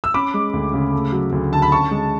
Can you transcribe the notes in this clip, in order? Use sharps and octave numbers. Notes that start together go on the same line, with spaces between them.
E6
C#4 B5 D6
G#3
D2
C#3
A3
F#3
D2
D3 A5
B5
C#4 A5 C#6
G#3